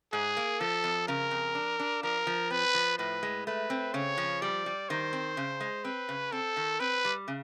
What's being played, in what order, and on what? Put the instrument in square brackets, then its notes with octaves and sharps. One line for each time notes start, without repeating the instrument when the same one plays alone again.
[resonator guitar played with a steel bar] G#2 [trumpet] G#4
[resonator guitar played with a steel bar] A#3
[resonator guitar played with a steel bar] F3 [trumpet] A4
[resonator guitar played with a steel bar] F2
[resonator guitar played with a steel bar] C#3 [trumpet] A#4
[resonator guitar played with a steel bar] F2
D4
D4
[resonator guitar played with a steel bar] F3 [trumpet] A#4
[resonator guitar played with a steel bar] F3
[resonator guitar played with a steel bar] C4 [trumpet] B4
[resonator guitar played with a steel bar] F3
[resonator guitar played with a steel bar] A2 [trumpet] B4
[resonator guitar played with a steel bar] G#3
[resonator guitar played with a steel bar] A3 [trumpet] B4
[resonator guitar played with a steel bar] C4
[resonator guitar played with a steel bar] C#3 [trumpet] C#5
[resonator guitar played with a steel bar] F3
[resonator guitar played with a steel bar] G3 [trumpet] D5
[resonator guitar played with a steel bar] G3
[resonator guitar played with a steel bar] D#3 [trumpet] C5
[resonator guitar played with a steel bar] C4
C#3
G#3
[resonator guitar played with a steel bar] C4 [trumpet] B4
[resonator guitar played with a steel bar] C#3
[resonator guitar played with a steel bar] C4 [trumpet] A4
[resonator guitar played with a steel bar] D#3
[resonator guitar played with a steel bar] C4 [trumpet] B4
[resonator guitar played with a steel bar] G3
C#3